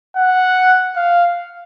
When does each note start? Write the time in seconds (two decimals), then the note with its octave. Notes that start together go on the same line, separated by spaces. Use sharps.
0.16 F#5
0.96 F5